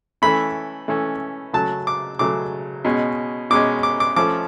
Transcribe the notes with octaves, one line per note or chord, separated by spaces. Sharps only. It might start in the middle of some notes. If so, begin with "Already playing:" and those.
E3 A3 C#4 B5
E3 A3 C#4
C#3 F#3 A3 A5
D6
C#3 F#3 A3 D6
B2 G#3 C#4
B2 G#3 C#4 D6
D6
D6
F3 A3 C#4 D6